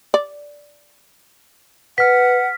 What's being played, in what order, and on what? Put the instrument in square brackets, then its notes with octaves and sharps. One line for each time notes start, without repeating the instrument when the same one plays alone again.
[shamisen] D5
[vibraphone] B4 [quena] F#5 [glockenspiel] F6 B6